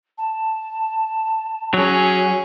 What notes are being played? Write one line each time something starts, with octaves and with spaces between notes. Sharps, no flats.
A5
F#3 C#4 G#4